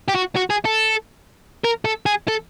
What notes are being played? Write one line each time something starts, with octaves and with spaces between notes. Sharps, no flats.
G4
F#4
F#4
G#4
A4
A#4
A4
G#4
A4